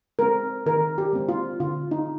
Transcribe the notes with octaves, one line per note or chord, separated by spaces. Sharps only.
G#3 C4 A#4
D#3 A#4
G4
G#3 C4
F4
D3 F4
D#4